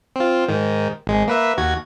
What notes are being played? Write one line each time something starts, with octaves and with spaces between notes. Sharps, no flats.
C4 F4
G#2 D#3
G#1 G#3
A#3 B4 E5
D#2 F#4 G#6